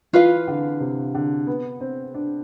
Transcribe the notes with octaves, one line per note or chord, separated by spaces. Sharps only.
E3 F4 B4 F5
D3
C3
D3
B3
C4
D4